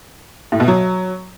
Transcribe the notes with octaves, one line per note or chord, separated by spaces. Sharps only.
A2
B2
F#3